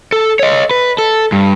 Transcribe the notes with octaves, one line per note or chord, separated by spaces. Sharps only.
A4
C#5 D#5
B4
A4
G2